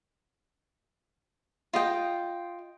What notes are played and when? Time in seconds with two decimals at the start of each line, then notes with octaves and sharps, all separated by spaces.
1.73 F4 D#5 G5